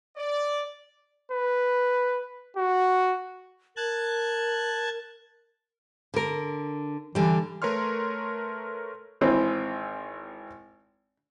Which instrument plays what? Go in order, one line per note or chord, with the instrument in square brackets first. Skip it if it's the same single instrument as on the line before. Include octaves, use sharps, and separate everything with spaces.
[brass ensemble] D5
[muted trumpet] B4
F#4
[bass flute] A#4 [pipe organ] A5 F#6 G#6
[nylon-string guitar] D3 A#4
[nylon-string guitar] D3 G3 [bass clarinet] E3
[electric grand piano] A3 A#4 B4 C#5 C6 F6
[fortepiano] G#1 E3 C4